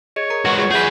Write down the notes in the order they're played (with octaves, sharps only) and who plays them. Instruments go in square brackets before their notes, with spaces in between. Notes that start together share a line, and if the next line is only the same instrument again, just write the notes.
[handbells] G#4 D#5 [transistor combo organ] C#5
[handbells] A#4 A#5
[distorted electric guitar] G#3 F#4 [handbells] B4 F#5 F6 [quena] C#6
[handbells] F4 G#4
[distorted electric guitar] G#4 B4 [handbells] E5 F#5 [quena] G6